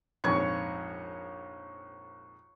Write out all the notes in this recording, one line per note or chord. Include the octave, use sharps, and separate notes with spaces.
A#1 F2 G#2 C#5 C#6